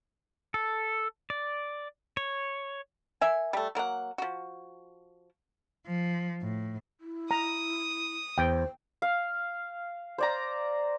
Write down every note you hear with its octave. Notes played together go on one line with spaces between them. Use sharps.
A4
D5
C#5
A#4 E5 G#5
G3 A3
F#3 A#3 A4 F#5
F3 F#4
F3
A2
E4
A#5 D#6
E2 C5 G5
F5
C5 D5 A#5